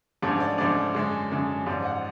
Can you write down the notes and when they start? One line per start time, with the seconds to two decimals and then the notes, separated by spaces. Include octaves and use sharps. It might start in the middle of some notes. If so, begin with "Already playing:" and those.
0.22 A1 G#2 F3 A3 D4 C#5
0.40 D5
0.58 A1 G#2 F3 A3 D4 D5
0.95 F#2 D3 G#3 C#4
1.31 F#2 D3 G#3 C#4
1.66 A1 G#2 F3 D5
1.85 F#5